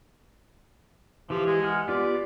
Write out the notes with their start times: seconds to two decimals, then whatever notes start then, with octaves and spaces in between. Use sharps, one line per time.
1.30 E3 F3 G4
1.46 G#3
1.63 F#5 G#5 F6
1.88 B3 F4 G4 D5